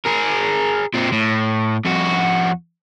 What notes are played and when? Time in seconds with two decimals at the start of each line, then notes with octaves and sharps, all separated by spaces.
0.05 G#4 A#4
0.94 A#2 C4
1.12 A2
1.85 F2 F#4